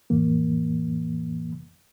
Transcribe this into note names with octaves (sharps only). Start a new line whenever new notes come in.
F2 A2 E3 A#3